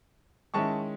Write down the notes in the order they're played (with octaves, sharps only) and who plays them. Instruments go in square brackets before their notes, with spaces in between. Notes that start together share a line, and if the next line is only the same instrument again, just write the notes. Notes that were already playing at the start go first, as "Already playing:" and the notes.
[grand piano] D#3 G#3 C#4 E4 A5 C#6